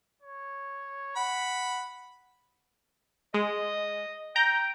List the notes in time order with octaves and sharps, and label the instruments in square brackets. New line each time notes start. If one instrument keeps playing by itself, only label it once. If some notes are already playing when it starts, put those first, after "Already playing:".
[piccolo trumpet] C#5
[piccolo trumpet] F#5 [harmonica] B5
[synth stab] G#3 [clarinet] D#5
[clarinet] G5 [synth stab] A#5 G6